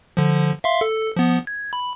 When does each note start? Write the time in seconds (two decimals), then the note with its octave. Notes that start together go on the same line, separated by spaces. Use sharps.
0.17 D3 F3
0.64 E5 F5 C6
0.81 A4
1.16 F3 B3
1.47 G#6
1.73 B5